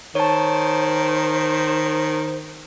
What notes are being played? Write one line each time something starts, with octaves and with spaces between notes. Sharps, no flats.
D#3 C5 C#5 A5